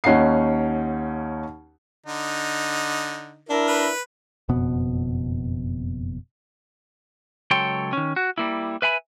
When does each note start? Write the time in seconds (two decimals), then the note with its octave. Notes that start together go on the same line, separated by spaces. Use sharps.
0.04 D#2 C#4 D#4 F#5 C7
2.06 D3 D#4
3.49 D4 E4 A#4
3.67 B4
4.49 F#1 F2 B2 B3
7.51 C#2 F#3 A4 C#5 G5 C6
7.93 D#3 C#4
8.16 F#4
8.38 G3 A#3 E4
8.82 B4 E5 G#5 B5